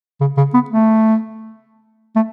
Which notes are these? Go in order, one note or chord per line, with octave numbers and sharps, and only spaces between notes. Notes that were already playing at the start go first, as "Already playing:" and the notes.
C#3
C#3
B3
A3
A3